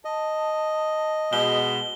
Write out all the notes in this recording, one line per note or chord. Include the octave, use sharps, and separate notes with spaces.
D#5 A5
B2 G#3 G7